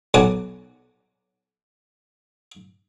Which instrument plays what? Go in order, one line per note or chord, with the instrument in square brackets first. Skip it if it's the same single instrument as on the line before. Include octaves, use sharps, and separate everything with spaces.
[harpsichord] B1 C#5 F#5 G#5 A5 D6